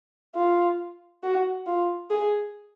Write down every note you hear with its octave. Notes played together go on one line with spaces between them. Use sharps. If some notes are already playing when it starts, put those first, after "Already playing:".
F4
F#4
F4
G#4